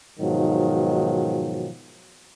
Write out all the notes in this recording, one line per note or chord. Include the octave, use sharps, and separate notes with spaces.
G#2 B2 D#3 F3 F#3